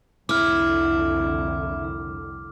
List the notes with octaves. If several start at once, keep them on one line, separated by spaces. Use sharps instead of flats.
C2 F2 D3 E4 D6 F6